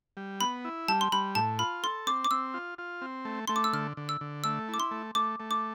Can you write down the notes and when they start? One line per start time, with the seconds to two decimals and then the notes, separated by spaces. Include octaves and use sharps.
0.17 G3
0.41 B3 B5
0.65 E4
0.88 G3 A5
1.01 C6
1.12 G3 B5
1.35 A2 A5
1.59 F4 B5
1.83 A4 C6
2.07 C4 D6
2.24 D6
2.31 C4 E6
2.54 F4
2.78 F4
3.02 C4
3.25 A3
3.48 A3 C6
3.56 D6
3.64 E6
3.73 D3 F6
3.97 D3
4.09 E6
4.21 D3
4.44 A3 E6
4.68 E4
4.74 D6
4.80 C6
4.91 A3
5.15 A3 D6
5.40 A3
5.51 D6